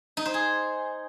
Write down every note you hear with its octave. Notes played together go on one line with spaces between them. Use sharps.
D#4
C5
G#4